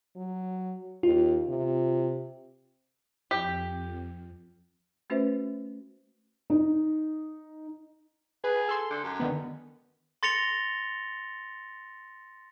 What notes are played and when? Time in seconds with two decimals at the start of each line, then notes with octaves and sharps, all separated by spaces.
0.16 F#3
1.03 D#2 F4
1.48 C3
3.31 F2 G4
5.10 A3 C#4 F#4 B4 C5 E5
6.50 D#4
8.44 G#4 B4
8.68 A4 C6
8.90 D3
9.03 F#2
9.20 D3 D#3 B3
10.23 C6 A6 A#6 C#7 F7 G7